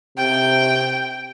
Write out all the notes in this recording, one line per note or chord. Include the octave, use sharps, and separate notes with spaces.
C3 G5